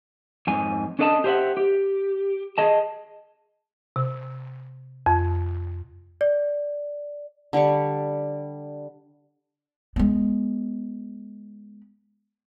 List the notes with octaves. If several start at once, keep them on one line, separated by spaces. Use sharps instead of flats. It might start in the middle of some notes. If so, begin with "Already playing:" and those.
F2 G#2 G#5
C#4 D4 A4 D#5 F5 A5
G4 G#4 C5 D#5 E5 F#5
G4
G#4 D#5 A5
C3
F2
D5
D3 G3 G4 C#6
G#3 B3